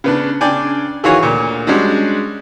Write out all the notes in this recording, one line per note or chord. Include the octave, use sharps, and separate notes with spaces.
C#3 B3 D4
C#3 D4 D5 G5 G#5
D#3 E3 F4 F#4 G#4 C#5
D2 A#2
G3 G#3 C#4 D4 F#4